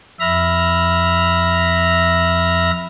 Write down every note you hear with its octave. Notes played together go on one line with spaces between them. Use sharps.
F2 E5 B5 F6 A#6